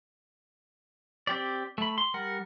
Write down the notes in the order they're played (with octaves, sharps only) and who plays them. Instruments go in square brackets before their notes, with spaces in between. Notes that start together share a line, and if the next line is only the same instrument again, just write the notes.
[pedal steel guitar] C4 G4 D5
A3 B5
C6
G3 A#4 F#5